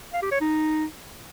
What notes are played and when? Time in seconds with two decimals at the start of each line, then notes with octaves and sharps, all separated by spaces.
0.13 F5
0.22 G4
0.31 C#5
0.41 D#4